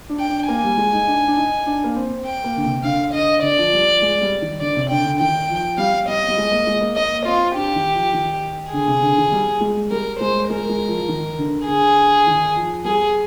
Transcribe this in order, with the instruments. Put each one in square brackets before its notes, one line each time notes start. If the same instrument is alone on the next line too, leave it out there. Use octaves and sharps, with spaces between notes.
[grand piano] D4
[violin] G5
[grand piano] D4
[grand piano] A#3 [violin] G#5
[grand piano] G3
G#3
D#4
D4
D4
D#4
D4
A#3
C4
[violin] G5
[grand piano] A#3
D3
C3
[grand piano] D3 [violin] F5
[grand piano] D3 [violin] D#5
[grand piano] D3 [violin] D5
[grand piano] F3
G3
F3
G#3
G3
D#3
[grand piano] D3 [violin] D5
[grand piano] C3
[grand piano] D3 [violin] G5
[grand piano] D3
[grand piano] D#3 [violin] G5
[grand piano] F3
[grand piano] G3 [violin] F5
[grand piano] G3 [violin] D#5
[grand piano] G3
G#3
A#3
G#3
A#3
[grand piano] A#3 [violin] D#5
[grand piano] C4 [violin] F4
[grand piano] D4 [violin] G4
[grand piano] D#3
F3
D#3
[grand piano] D3 [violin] G#4
[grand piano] C3
D3
D#3
G3
G#3
[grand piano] G3 [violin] A#4
[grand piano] G#3 [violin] C5
[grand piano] G#3 [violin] A#4
[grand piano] G#3
F3
F3
D#3
D3
[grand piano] D3 [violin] G#4
[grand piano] D#3
F3
[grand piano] G3 [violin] G#4